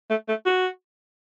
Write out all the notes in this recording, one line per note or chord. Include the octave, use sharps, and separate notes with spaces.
A3
A3
F#4